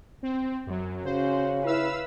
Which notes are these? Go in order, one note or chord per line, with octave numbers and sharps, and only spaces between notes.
C4
F#2 F#3
C#3 C#4 F#4 C5
E4 B4 F5 E6